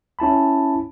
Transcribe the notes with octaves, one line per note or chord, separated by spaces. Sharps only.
C#4 E4 A5 B5